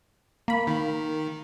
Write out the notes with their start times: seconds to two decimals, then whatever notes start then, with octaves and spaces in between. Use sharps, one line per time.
0.48 A#3 B5
0.67 D#3